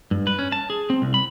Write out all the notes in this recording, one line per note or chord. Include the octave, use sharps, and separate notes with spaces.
G2
B4
C#4
A5
G#4
C4
C2
B5